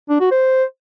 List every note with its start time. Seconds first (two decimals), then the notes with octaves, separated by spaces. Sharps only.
0.10 D4
0.21 F#4
0.31 C5